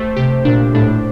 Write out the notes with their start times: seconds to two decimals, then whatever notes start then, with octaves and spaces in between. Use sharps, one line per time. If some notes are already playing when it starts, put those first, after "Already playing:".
Already playing: A3 G4 C5
0.17 C3 G4
0.45 A#2 D4
0.74 A2 D4